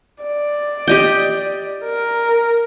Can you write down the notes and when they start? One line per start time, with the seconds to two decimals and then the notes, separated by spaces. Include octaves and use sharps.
0.23 D5
0.88 G4 D#5 G5
1.84 A#4